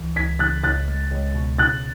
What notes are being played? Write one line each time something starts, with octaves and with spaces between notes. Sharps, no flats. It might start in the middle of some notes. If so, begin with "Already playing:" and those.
Already playing: C#2 E3
C#2 G#6 B6
C#3 F#6 A6
C#2 F#6 A6
G#3
C#2
B2
C#3 F#6 A6